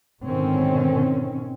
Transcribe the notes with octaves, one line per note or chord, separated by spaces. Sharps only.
G#2 B2 D3 D#3 C4 C#4